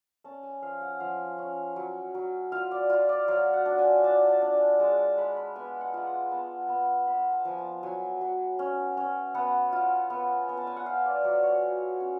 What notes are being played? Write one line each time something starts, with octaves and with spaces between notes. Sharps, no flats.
C#4 A5
G#5
F3 F5
F#5
F3 F5
C#4
F#3
F#3
F4 F5
D5
F4
D5
F#3 F5
F#5
D4
G#5
D4 A5
A5
D4
G#5
G#3 A5
A5
G#3 B5
B5
B3 G#5
F#5
F4
F#5
B3 A5
B3
B3 B5
A5
F3 G#5
A5
F#3 G#5
F#3
C#4
C#4
B3 F#5
F4
B3
B3
A5
G#5
F#5
F4 F5
D5
F#3 D5
C#5
F#3
C#4